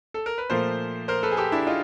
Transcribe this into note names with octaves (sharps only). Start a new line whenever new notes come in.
A4
A#4
B4
A#2 F3 A3 A#4 C5
A#4 C5
A4 B4
G#4
G4 A4
D4 E4
D#4 F4